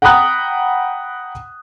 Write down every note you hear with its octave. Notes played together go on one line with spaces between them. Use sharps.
F#5 G5 A#5 B5 D#6 F#6